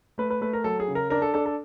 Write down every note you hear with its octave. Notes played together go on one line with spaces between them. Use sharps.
A3 B4
B4
A3 B4
A#4
F#3 A4
G#4
C#3
A#4
D4 A#4
A4
D4 A4
A4